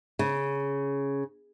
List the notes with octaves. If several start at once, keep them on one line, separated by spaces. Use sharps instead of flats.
C#3